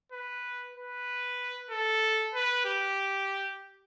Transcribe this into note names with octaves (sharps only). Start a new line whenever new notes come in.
B4
B4
A4
B4
G4